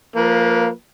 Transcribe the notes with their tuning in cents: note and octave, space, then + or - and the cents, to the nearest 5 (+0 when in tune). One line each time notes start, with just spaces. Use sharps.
F3 +0 A#3 -10 B4 -40